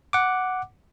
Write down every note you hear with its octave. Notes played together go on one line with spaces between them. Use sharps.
F#5 D6